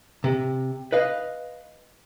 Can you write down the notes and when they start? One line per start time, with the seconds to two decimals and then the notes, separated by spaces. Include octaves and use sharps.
0.24 C3
0.92 B4 D#5 F5